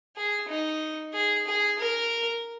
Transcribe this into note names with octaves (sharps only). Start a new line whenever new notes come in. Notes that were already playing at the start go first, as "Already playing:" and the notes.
G#4
D#4
G#4
G#4
A#4